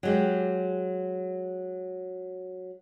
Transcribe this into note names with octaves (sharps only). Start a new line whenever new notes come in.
F#3 G#3 G4